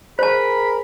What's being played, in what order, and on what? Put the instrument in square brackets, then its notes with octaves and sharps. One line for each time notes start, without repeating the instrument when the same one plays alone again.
[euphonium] G#4 [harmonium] A#4 [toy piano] C5 A5 [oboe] B5